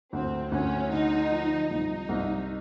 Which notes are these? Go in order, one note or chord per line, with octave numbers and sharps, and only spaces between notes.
D2 C4
D2 C#4
D3 D#4
F3
C2 D#4
C2